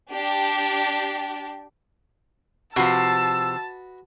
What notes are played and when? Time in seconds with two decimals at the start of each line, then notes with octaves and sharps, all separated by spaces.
0.11 D4 G4
2.76 C3 F3 F#4 B4 D#5 A5 E6